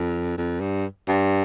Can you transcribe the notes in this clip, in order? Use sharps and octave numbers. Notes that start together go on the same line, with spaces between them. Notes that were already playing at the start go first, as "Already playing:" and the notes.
Already playing: F2
F2
G2
G2